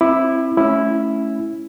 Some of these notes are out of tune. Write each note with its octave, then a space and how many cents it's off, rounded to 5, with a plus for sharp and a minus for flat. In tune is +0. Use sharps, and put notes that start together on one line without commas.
C4 +25 E4 +0 D6 +30
A3 -25 C#4 +0 E4 +0